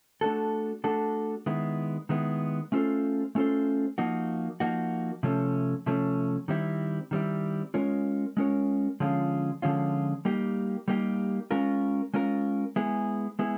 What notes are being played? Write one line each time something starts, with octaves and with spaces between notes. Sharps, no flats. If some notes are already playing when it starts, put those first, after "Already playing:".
A3 D4 F#4 A4
A3 D4 F#4 A4
D#3 G#3 B3 E4
D#3 G#3 B3 E4
A3 C#4 F4 A4 C5
A3 C#4 F4 A4 C5
F3 A#3 D#4 F#4
F3 A#3 D#4 F#4
C3 F3 A3 C#4
C3 F3 A3 C#4
D#3 G3 C4 E4
D#3 G3 C4 E4
G#3 C#4 F4 A#4 C#5
G#3 C#4 F4 A#4 C#5
D3 F3 G#3 C#4 F4
D3 F3 G#3 C#4 F4
G3 A#3 D#4 G4
G3 A#3 D#4 G4
G#3 C#4 F4 A#4
G#3 C#4 F4 A#4
G#3 B3 E4 G#4
G#3 B3 E4 G#4